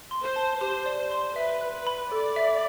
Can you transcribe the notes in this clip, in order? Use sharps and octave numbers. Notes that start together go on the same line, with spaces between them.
C6
C5
A5
G4 C5
D5
C5
C6
B4 E5
F#6
B4
B5
A4 D5
E5